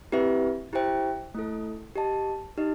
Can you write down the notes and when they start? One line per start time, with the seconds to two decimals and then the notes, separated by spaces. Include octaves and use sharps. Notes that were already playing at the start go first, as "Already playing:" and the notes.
0.12 C4 E4 G4 B4 E5
0.73 E4 G4 C5 E5 G5
1.35 A3 E4 A4
1.95 G4 D#5 A5
2.58 D#4 G4 D#5